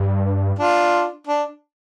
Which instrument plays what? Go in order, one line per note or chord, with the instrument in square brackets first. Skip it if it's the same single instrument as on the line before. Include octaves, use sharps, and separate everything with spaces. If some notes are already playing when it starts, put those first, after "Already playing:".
Already playing: [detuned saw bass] G2
[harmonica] D4 F4
D4